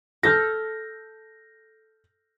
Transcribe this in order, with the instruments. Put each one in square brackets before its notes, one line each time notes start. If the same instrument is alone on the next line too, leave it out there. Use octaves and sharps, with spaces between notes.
[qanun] A4 [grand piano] F6 G6 A#6